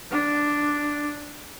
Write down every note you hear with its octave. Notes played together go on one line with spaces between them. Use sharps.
D4